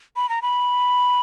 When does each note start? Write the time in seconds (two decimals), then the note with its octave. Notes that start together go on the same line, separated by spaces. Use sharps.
0.16 B5
0.29 A#5
0.42 B5